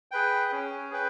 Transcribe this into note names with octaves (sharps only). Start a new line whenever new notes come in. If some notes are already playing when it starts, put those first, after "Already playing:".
G#4 B4 G5
C#4
G#4 B4 G5